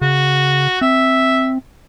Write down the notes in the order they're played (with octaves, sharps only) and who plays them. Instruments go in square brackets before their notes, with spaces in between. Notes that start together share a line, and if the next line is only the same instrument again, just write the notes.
[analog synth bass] C#3 [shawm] F#4
[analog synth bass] C4 [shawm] E5